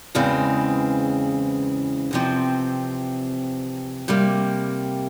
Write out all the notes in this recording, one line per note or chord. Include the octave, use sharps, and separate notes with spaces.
E2 C#3 E3 G#3 C4
E2 C3 F3 C4
C3 G3 A#3